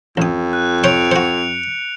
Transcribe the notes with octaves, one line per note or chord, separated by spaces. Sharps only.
A1 F2 D#6
F#6
C5 C#5 C6 C#7 D7 F7
F#4 C5 C#7